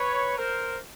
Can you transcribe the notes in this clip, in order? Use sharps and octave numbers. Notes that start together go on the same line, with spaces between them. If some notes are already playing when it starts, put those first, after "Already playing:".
Already playing: B4 C#5
A#4 C5